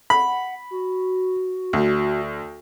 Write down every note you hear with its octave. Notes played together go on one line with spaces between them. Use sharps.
F#5 B5
F#4
D2